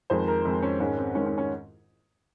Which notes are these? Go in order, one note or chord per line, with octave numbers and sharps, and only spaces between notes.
F2 D#3 G#3 C5
A#4
F2 D#3 G#3 C4
C#4
G#2 D#3 G#3 C#4
C4
G#2 D#3 G#3 C#4
C#4
C#4